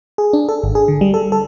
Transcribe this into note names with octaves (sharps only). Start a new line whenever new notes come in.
G#4
D4
A4
G#1
G#4
D3
G3
A4
A4